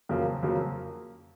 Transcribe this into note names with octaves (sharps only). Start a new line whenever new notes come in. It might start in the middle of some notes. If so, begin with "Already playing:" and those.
F2 C#3 F#3 A#3
F2 C#3 F#3 A#3